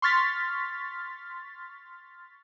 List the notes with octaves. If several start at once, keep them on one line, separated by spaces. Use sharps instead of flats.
C6 C#6 F6 A6 B6